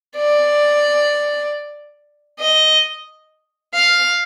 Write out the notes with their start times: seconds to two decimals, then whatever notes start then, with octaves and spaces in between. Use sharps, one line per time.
0.16 D5
2.40 D#5
3.74 F5